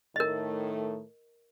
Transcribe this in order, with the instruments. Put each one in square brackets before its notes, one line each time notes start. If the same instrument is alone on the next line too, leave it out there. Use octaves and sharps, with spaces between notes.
[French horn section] A2 D#3 A3 [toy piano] A#4 D#5